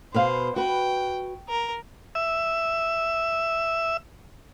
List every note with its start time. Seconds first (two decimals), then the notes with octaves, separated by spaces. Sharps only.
0.14 B2 B3 C5 F5
0.56 F#4 B4 G5
1.49 A#4
2.15 E5 E6